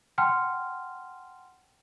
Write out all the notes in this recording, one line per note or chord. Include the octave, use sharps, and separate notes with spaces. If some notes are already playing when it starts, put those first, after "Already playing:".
F#5 G5 A5 C6 F6